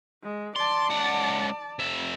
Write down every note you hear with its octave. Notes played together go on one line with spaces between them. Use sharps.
G#3
D5 A5 C6
C#2 F#5
F2 E5